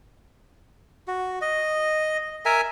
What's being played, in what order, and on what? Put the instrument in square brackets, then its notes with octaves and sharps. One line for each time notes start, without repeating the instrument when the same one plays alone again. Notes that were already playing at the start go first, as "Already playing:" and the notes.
[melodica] F#4
D#5
A#4 E5 G#5 A#5